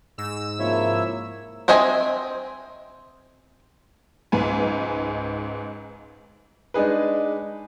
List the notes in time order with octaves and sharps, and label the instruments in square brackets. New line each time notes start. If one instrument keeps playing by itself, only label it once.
[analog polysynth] G#2 E6
[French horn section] C3 F3 A#3 [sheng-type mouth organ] E4 C#5 E5
[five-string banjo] C4 C5 D#5 E5 G#5
[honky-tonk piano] C#2 G#2 B4 G#5
[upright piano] G#3 D4 D#4 G#4 B4